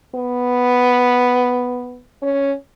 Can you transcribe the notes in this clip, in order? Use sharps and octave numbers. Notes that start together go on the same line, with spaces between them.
B3
C#4